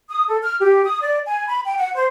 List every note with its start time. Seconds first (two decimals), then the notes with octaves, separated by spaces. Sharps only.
0.09 D#6
0.28 A4
0.42 F6
0.60 G4
0.84 D#6
1.01 D5
1.26 G#5
1.48 B5
1.65 G5
1.78 F#5
1.95 C5